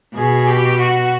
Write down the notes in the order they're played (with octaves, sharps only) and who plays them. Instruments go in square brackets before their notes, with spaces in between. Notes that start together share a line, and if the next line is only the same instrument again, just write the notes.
[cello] B2 [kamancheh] G#4
[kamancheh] G4
F#4